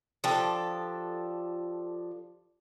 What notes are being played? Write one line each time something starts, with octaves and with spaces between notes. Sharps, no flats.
F3 D4 G4 A4